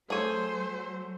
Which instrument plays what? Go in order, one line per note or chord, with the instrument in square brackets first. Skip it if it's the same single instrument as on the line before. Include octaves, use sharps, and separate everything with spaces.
[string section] F#3 [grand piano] A3 D#7 [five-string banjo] G#4 C#5 [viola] C5